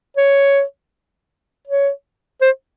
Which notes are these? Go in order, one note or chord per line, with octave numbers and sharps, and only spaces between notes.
C#5
C#5
C5